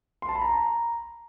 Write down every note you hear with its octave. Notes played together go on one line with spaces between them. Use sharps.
C6
A5
B5
A#5